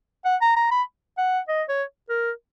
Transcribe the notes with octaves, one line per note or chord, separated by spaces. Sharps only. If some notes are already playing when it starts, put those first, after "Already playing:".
F#5
A#5
A#5
B5
F#5
D#5
C#5
A#4